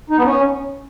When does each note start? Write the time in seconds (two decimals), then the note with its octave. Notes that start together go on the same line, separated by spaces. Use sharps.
0.10 D#4
0.18 B3
0.25 C#4